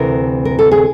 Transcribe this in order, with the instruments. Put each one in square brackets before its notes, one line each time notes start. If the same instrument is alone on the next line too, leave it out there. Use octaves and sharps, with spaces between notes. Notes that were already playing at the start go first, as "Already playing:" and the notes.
Already playing: [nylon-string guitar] D2 C3 E3 A#4
A#4
A4
G#4